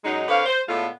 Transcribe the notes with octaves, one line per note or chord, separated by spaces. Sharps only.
F#2 F#3 G#3 D#4
D3 C4 B4 C#5 F5
C5
A2 D3 G#3 A3 B3 F4